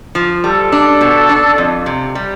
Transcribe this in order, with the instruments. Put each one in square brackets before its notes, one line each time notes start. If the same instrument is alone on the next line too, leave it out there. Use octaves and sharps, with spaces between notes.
[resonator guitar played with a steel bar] F3
[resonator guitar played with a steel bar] G3 [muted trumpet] A4
[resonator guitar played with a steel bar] D4
B2
D4
F2
C3
G3